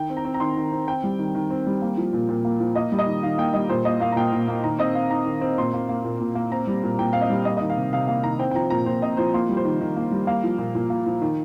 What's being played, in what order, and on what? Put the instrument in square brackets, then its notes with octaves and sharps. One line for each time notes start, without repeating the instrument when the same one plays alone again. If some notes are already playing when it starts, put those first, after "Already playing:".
Already playing: [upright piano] D#3 G5
C4
A#5
C4
A#5
D#3 C6
D#3
C4
C4 G5
G3
D#3
D#3
C4
G3
A#3
F3
A#2
A#2
A#3
F3
A#3 D#5
G3
D#5
D#3
D#3 F5
A#3 G5
G3 D#5
A#2 C5
A#3 D#5
A#3 F5
A#5
A#2 G5
A#2
A#3
D#3 A#5
C4 D#5
C4 F5
D#3 A#5
D#3
C4
A#2 C6
A#3
A#3
A#2
A#2
A#3
C4 A#5
G3
A#2
A#2 G5
C4 F5
D#5
G3
A#3 D#5
D#3 D#5
F5
C3
C3 F5
A#3 F5
D#3 A#5
C4 G5
G5
F3 A#5
A#2 A#5
A#2 C5
C4 D#5
F3 C5
A#3 C6
G3
C5
D#3
D#3
A#3
G3
A#3 F5
F3
A#2
A#2
A#3
F3
D#3